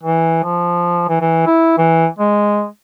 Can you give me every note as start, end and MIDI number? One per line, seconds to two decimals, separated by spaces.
0.03 0.44 52
0.44 1.07 53
1.09 1.20 52
1.21 1.43 52
1.47 1.75 64
1.78 2.07 52
2.19 2.67 56